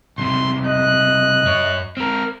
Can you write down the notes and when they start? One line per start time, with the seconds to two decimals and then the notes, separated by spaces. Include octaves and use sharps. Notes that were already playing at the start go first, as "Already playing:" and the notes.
0.18 B1 C3 C6
0.65 D#5 F#6
1.45 F#2 C#5
1.97 C4 A#4 F6